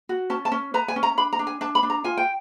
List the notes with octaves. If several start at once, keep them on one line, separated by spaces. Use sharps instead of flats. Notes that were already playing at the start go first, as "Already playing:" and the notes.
F#4
C#4 A5
A5
C#4
B4 A#5
G#5
C#4
A#5
D4 B5
A#5
D4
G#5
D4 A5
B5
D4
A#5
F4 G#5
G5